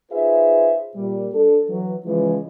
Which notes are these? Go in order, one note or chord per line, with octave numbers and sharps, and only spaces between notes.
D#4 F4 G#4 B4 C5 E5
A#2 G3
D4 A4
E3 F#3
C#3 E3 F3 G#3